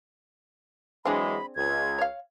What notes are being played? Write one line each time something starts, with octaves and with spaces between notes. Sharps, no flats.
E3 F#3 G#3 C4 D4 G#4 B5
C#2 G#6
C#5 F5